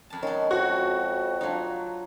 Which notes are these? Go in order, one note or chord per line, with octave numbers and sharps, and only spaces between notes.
F2 A5
D#3 G#3 B3 C#4
F2 F#4 E5
F#3 D4 D#4 F4 D5